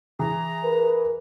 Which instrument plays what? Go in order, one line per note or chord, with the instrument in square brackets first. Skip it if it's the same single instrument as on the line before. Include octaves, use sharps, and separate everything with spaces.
[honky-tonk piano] E3 G#4 [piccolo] A#5
[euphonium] A#4 [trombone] B4